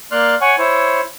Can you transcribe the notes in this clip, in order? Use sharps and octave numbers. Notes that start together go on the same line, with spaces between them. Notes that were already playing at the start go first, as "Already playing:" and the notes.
A#3 D5 C6 F6 F#6
C#5 F#5 G#5 C#6
E4 C5 C#5